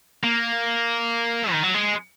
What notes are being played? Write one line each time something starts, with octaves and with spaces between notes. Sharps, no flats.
A#3
D#3
F#3
G#3